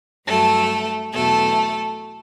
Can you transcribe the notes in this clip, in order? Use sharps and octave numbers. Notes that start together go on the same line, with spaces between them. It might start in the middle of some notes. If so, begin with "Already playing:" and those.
G2 F#3 A3 A4
E2 B2 F#3 A3 A4